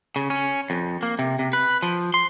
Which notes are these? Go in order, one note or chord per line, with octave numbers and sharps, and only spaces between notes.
C#3
C#4
F2
A#3
C3
C3
B4
F3
C6